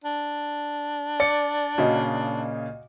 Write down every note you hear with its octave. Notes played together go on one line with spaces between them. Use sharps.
D4
D5 C#7
A#2 C#3 F#4 D#5